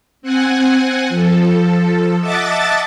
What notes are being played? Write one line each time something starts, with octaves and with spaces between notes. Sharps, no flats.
C4 F#5 G#5
F3 A4
D#5 E5 F#5 A5 D6 A6